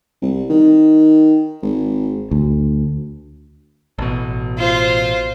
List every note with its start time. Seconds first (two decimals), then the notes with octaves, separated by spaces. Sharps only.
0.22 C2
0.50 D#3
1.62 G#1
2.31 D2
3.98 A1 B2
4.58 F4 C5